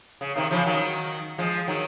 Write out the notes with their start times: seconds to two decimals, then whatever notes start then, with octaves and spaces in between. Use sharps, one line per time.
0.21 C#3
0.36 C3 D#3
0.51 C#3 F3
0.66 D#3 F#3
1.38 F3 G#3
1.68 D#3 F#3